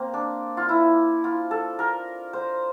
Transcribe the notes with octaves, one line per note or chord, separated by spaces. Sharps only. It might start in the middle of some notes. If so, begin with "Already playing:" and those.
Already playing: A#3 C4
D4
F4
E4
F4
A4
A#4
C5